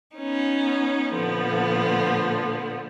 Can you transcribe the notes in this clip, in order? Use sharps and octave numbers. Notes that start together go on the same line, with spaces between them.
B3 C#4 D#4
A#2 D3 F3 B3